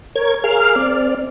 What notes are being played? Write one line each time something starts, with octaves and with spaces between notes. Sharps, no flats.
A#4 C#5 G#6
G#4 A#4 F5 F6
C4 D5